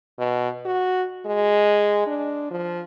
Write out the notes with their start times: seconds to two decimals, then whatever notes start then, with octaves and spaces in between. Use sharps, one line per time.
0.19 B2
0.65 F#4
1.26 G#3
2.07 D4
2.51 F3